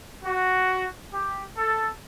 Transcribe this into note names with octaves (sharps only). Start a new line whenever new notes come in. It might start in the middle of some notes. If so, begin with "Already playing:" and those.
F#4
G4
A4